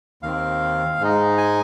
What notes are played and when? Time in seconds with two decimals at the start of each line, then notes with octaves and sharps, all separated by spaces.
0.23 D#2 D#3 C4 F5
0.99 G#2 G#3 D#4
1.38 G#5